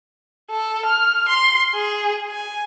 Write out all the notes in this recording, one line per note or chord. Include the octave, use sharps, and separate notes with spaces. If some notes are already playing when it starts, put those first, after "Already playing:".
A4
F6
C6
G#4
G#5